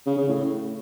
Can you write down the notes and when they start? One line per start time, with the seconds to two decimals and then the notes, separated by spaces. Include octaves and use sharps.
0.07 C#3
0.17 C#3
0.28 A2